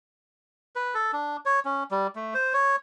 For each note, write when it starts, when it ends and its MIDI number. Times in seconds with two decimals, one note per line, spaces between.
0.76 0.95 71
0.95 1.12 69
1.13 1.37 62
1.45 1.60 73
1.65 1.84 61
1.91 2.07 55
2.16 2.34 57
2.34 2.53 72
2.53 2.76 73